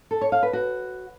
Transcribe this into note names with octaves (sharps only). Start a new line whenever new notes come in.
A4
C#5
F5
B4
F#4